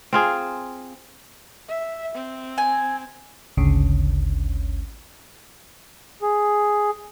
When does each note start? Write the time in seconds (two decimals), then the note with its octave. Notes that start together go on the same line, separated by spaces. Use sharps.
0.13 C4 F4 G#4
1.68 E5
2.15 C4
2.58 G#5
3.57 G#1 D2 C#3
6.22 G#4